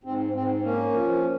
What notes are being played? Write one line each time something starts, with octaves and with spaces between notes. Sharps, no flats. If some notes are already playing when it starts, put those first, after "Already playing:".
G#2 C4
G#2 C4
A#3 C#4
F3